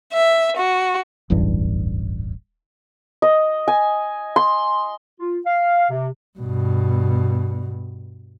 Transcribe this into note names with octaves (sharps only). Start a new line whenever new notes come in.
E5
F#4
D1 A1 E2 G2
D#5
G#5
C6
F4
F5
C3
G2 B2